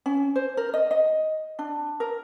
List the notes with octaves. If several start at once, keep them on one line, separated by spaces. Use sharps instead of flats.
C#4
C5
A#4
D#5
D#5
D4
A#4